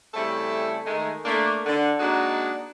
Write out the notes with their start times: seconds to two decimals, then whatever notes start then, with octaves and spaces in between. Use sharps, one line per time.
0.14 C#3 G3 A3 C4 E4 A4
0.86 D#3 G#3 A3
1.25 A3 A#3 D4
1.66 D3
2.00 G#3 A#3 D4 D#4 F#4